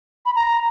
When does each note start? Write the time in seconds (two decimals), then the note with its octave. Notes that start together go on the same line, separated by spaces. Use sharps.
0.26 B5
0.36 A#5